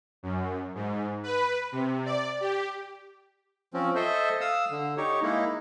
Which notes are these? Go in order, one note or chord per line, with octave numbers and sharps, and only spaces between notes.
F#2
G#2
B4
C3
D5
G4
F3 C4 C#4
A4 C5 D#5 E5
F5 D#6 E6
D3
D#4 G4 C#5
G#3 A#3 D#4 E4